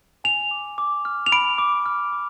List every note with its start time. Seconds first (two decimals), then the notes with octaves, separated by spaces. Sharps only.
0.24 G#5 F7
0.51 D6
0.78 D6
1.05 F6
1.26 F7
1.32 B5 D7
1.58 D6
1.86 F6
2.13 D6